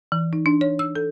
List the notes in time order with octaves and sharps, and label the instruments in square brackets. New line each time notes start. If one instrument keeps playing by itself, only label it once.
[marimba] E3
D#4
D4
C#5
E6
A4